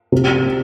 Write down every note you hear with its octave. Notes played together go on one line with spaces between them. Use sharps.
C3